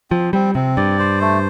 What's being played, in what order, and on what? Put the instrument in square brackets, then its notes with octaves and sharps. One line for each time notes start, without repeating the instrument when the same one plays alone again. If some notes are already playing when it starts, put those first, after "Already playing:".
[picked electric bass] F3 [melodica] C4
[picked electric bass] G3 [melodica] C4
[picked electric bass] C3 [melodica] C4
[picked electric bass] G2 [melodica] D5
[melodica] C5
A3